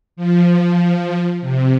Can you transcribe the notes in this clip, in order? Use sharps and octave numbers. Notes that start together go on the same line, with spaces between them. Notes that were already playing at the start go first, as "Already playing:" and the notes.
F3
C3